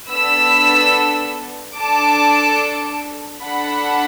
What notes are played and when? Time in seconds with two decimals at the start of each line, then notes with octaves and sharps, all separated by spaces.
0.10 B3 D4 A4 B5 E6
1.77 D4 A4 A5 D6
3.43 D4 A4 F#5 B5